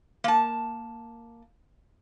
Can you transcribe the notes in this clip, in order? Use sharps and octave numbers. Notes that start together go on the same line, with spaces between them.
A#3 A5